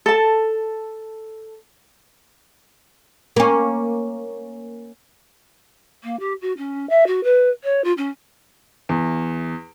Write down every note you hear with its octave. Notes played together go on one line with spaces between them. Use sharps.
A4 A5
A#3 C#4
A#3
G4
F#4
C#4
E5
F#4
B4
C#5
F4
C#4
E2